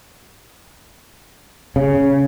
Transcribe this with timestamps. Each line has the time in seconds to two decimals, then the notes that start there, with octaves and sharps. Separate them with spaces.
1.76 C#3